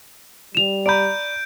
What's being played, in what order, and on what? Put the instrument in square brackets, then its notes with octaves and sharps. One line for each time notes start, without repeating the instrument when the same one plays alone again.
[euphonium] G3 [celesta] E7 F7
[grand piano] D5 A#5 B5 [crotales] G6 D7